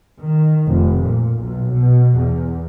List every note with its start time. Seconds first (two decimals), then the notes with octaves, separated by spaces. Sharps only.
0.20 D#3
0.67 F1
1.04 A#2
1.40 B1
1.77 B2
2.19 E2